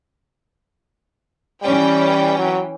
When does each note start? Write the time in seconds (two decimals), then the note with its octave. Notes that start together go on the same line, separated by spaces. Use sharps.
1.63 E3 G3 C#4 G5
2.38 F#3